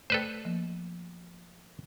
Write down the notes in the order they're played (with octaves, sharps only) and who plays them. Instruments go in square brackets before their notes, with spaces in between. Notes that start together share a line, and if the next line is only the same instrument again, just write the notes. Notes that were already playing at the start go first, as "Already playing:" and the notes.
[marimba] A3 D5 G5 [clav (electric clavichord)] A4 B4 C5
[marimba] F3 A#3